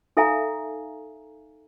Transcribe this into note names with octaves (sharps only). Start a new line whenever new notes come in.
D#4 A4 E5 F5 G#5 A#5